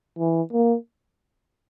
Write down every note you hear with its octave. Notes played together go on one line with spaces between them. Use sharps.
E3
A#3